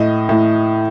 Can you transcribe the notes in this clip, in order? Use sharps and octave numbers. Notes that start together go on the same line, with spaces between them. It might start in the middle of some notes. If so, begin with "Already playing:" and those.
Already playing: A2 D#5
A2